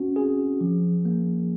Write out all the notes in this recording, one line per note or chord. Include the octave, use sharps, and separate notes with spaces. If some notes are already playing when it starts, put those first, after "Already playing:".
Already playing: C4 C#4 F#4
G#4
F3
A#3